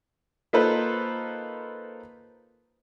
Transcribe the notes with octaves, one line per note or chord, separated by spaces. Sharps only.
A#3 D#4 F4 A4 B4 C5